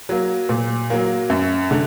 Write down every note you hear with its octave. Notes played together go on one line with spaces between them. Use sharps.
F#3 A#3
A#2
F#3 A#3
F#2
D3